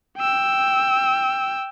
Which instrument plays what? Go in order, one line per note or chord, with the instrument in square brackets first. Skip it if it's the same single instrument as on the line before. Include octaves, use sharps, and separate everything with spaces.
[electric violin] G5 E6